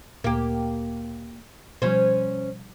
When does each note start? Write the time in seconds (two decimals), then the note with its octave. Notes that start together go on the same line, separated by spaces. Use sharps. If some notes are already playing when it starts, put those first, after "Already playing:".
0.24 D2 A#2 A#3 G4
1.82 B2 F3 G3 C#4 C5